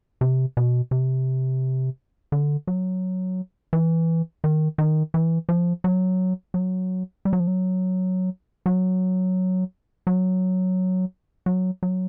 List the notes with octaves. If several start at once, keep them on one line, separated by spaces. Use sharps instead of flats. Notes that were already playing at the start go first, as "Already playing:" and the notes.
C3
B2
C3
D3
F#3
E3
D#3
D#3
E3
F3
F#3
F#3
G3
F#3
F3
F#3
F#3
F#3
F#3
F#3